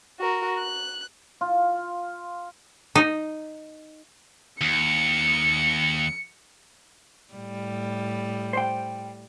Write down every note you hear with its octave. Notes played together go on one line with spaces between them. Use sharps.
F#4 A#4
F#6
F4
D#4
D#2 C#7
A2 G3
C5 G5